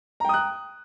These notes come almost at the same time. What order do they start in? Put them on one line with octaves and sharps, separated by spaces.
A#5 G5 D#6 F#6